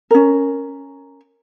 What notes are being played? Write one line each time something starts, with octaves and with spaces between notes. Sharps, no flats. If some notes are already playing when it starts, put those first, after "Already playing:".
C#4 A#4